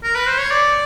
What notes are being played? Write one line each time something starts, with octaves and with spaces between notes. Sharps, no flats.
A#4
B4
C5
C#5
D5